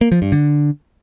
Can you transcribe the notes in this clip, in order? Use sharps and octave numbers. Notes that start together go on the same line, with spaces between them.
A#3
F3
G2
D3